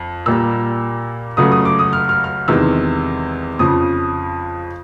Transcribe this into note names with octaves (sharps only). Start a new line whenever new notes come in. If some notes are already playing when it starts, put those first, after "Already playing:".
Already playing: F2
A#2 G3 A#3 E6
C#2 C#3 F#3 A3 D#6
D#6
D6
D#6
F6
F6
F6
E2 C3 D#3 G#3 E6
F2 C#3 F3 D#6